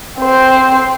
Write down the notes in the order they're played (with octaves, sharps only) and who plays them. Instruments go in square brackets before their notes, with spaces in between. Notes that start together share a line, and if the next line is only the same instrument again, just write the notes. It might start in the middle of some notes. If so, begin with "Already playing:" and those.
[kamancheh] C4 C5